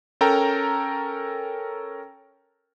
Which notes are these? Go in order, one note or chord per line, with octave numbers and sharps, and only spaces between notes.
C#4 A4 A#4 G5 A#5